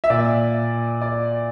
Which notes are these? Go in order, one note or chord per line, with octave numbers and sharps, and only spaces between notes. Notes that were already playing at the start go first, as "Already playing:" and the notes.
E5
A#2 D5
D5